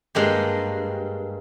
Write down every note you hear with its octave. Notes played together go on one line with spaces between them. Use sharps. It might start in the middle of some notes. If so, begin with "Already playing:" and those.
G2 G#3 A#3 G4